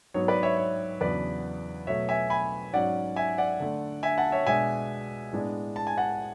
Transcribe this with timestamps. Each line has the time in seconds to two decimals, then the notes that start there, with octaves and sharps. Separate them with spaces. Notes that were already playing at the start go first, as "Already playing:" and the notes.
0.14 G#2 F#3 B3 C#5
0.28 B4 D5
0.43 C#5 E5
0.57 C#5
1.01 E2 C#3 F#3 B3 D4 B4 D5
1.87 B2 F#3 A3 C#5 E5
2.09 E5 G#5
2.30 G#5 B5
2.73 G#2 F#3 C#4 D5 F#5
3.16 E5 G#5
3.38 D5 F#5
3.60 D3 A3 D4
4.03 E5 G#5
4.18 F#5 A5
4.32 C#5 E5
4.46 B2 G#3 D4 E5 G#5
5.32 A2 G#3 B3 D4
5.76 A5
5.87 G#5
5.98 F#5 A5